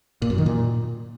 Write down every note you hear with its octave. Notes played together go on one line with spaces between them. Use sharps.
A#2
F#2
D#3
A#2